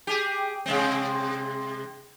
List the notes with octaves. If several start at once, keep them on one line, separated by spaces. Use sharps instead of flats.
G4 G#4
C3 G#3 C4